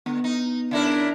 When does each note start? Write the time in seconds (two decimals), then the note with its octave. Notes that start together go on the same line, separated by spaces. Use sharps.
0.06 D3 B3
0.24 D#4
0.71 C#3 D4 E4 A#4